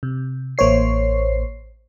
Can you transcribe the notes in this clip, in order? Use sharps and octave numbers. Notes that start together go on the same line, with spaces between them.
C3
A1 A#3 C5 C#5 C7